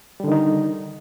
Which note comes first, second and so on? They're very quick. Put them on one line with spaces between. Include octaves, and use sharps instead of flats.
G3 D3 D#3 D#4